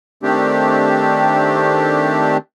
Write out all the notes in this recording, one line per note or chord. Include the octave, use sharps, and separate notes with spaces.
D#3 A3 C4 D4 G4